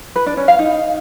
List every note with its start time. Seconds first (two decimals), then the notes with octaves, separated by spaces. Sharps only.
0.16 B4
0.26 D4
0.37 C#4
0.48 F5
0.59 D#4